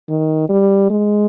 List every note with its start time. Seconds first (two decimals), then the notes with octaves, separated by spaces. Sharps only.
0.09 D#3
0.49 G3
0.90 G#3